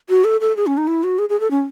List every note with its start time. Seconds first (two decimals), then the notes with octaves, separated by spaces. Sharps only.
0.09 F#4
0.24 A4
0.41 A4
0.57 G#4
0.67 C#4
0.77 D#4
0.88 E4
1.04 F#4
1.19 G#4
1.29 G#4
1.40 A4
1.51 C#4